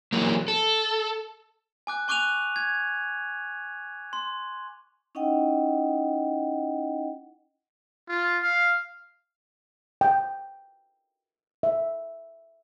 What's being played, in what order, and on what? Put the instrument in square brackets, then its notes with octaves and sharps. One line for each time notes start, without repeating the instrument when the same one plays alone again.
[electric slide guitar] E3 F#3 A#3
A4
[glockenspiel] G#5 D6 F#6
G#5 C#6 D6 F#6 D#7 F7
G#6
C6
[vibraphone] C#4 D#4 E4 D#5 F#5 G5
[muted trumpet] F4
F5
[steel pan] G5
E5